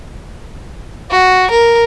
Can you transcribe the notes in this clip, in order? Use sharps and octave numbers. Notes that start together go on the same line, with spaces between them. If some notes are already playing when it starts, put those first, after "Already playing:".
F#4
A#4